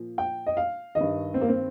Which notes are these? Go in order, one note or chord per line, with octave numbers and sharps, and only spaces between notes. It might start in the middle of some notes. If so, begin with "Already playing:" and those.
Already playing: A#2 F3
G5
D#5
F5
D#3 D#5
G2
C4
A#3
C4